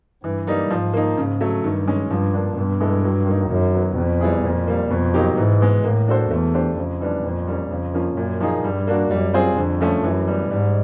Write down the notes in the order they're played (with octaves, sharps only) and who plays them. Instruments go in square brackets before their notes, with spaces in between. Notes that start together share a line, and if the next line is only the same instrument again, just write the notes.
[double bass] G2 [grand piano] E3
[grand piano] G3 A#3 D#4
[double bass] G#2 [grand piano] F3
[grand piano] A#3 D#4
[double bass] G#2 [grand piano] C#3
[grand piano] F#3 A3
[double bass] G2 [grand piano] D#3
[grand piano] G#3 C#4
[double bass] G2 [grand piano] F3
[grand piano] A#3 D4
[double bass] G2 [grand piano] B2
[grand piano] G#3 B3 E4 A4
F#3
A#3 D#4
[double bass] F#2 [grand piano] D#3
[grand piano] F#3 B3
[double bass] F2 [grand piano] B2
[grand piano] G3 B3 E4 G#4
[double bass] F2 [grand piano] A#2
[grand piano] G3 A#3
[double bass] F2 [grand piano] B2
[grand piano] F#3 A#3 D#4 G4
[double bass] G#2 [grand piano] E3
[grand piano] G#3 B3
[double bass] A2 [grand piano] A#3
[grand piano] D4 F#4 A4 C5
[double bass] E2 [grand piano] A3
[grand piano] D4 G4 C5
[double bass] F2 [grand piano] C#3
[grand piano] E3 G3 B3 D4
[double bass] F2 [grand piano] A#2
[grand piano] G3 A#3 C#4
[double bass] F2 [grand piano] C#3
[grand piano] F3 A#3 C#4 F4
[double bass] F#2 [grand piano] A#2
[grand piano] F3 A#3 D#4 G#4
[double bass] G2 [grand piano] G3
[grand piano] A#3 D4 F#4
[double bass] F#2 [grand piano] G3
[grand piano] C4 F4 G#4 C5
[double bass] F2 [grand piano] D3
[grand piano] F3 A3 C#4
[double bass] F#2 [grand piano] E3
[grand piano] G3 B3
[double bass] G#2 [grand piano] G3